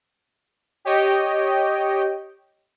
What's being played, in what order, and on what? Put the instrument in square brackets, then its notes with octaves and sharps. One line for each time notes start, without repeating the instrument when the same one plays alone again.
[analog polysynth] G4 C#5 D#5 G5